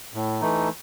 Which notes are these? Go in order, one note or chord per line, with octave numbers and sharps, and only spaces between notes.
A2
E3 A3 D#4